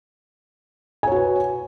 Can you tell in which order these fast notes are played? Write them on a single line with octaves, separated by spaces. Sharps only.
G#5 C#5 F#4 B4